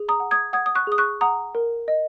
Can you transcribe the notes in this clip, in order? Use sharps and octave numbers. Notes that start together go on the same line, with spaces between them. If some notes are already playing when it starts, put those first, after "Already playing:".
Already playing: G#4
A#5 D#6
F#5
D#6 G#6
F#5 D#6 G#6
D#6
C#6 F#6
G#4 D#6
C#6 F#6
F#5 A#5 D#6
A#4
D#5